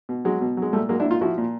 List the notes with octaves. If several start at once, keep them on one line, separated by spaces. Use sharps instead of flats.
B2
F#3 G#3
B2
F#3 G#3
A#2 G3 A3
F#3 G#3 A#3
D4 E4
A#2
D#4 F4
F3 E4 F#4
A#2